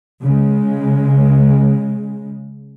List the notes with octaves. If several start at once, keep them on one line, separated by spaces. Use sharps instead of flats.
C#3 G#3